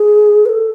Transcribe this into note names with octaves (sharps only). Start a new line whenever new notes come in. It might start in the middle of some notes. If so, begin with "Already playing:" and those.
Already playing: G#4
B4
A4